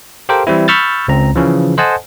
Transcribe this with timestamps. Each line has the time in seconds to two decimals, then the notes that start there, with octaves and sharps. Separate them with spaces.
0.29 G4 A4 A#4 C5 F5 G5
0.47 E3 G3 C4 E4
0.68 B5 C#6 E6 F6 G6 A6
1.08 C#2 C4 A#5
1.36 C#3 E3 F3
1.77 A4 C5 D#5 F#5 G#5 A5